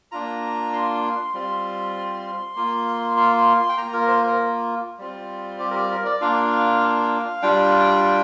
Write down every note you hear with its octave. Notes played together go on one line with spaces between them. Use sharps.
A#3 D4 F4 A#5
C6
G3 C4 F4
A#3 F4
C6
G5
A#3 F4 A#5
A#4
C5
A#4
G3 C4 F4
G4
A#4
G4
A#4
D5
A#3 D4 F4 F5
G3 D4 F4 G5